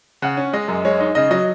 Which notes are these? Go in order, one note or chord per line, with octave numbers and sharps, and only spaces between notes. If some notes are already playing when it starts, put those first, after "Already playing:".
C#3 F#5
C#4
G#3 D#5
F#2
G#3 C#5
D#4
C#3 D#5
F#3 D#5